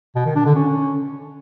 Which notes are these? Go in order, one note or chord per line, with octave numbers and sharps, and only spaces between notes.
B2
D#3
D4
D3
C#4